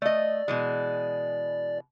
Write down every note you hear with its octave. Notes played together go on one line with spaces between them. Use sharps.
A3 D5 D#5
B2 E3 G#3